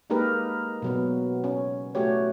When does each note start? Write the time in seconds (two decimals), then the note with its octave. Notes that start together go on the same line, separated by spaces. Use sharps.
0.10 G#3 A#3 D#4 G4 A#4 B4
0.82 B2 F#3 B3
1.44 C#4
1.95 A3 F#4 G4 C#5